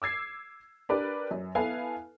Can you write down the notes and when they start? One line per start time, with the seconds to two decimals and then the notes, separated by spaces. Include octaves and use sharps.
0.02 D6 E6 G#6 C7
0.89 D4 G4 A#4 B4 D5
1.31 F#2
1.55 B3 E4 A4 B4 F5 G#5